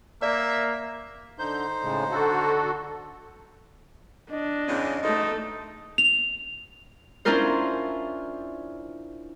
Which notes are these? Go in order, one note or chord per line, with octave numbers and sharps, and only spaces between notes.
A#3 D5 E5
D3 D#4 C5 G6
A2 C#3 G#3
D3 F#4 A4
D4 D#5
E2 C#3
G#2 B2 A3 D#4 A4
F7
C#4 D4 E4 F4 A#4 C5